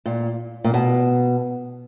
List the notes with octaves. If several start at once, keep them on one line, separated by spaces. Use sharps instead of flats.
A#2
A#2
B2